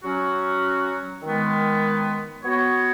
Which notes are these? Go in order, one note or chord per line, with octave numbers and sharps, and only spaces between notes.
F#3 C#4 F#4
D#3 G#3 B3
B3 F#4 C#5